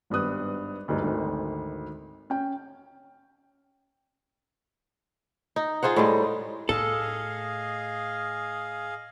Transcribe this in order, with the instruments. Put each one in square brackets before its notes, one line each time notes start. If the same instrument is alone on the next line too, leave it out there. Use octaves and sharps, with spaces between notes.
[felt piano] G#1 G2 B3 D#6 F#6
D2 G2 D#4
G#1 D2 D#3
C#4 G5
[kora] D#4
F4 G#4 C5 F#5
A2 G3 G#3
[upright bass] A2 [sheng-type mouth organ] G#4 D#5 F5 [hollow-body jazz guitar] A4